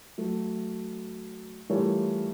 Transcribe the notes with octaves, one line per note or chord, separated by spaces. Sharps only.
F#3 A3
E3 G3 A3 F4 A#4 C#5